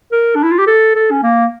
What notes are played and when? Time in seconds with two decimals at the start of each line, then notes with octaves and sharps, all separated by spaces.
0.12 A#4
0.35 D4
0.43 E4
0.51 F4
0.59 G4
0.67 A4
0.95 A4
1.11 C#4
1.23 A#3